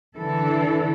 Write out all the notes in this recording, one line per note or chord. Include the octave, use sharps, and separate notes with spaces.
D3 E3 A4